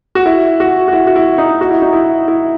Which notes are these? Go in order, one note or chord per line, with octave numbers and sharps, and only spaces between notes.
F#4
E4
F#4
F#4
E4
F#4
E4
D#4
F#4
E4
D#4
E4
E4